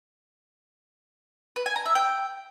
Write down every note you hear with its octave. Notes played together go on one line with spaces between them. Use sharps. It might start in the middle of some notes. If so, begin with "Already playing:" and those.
B4
G#5
A#5
E5
G5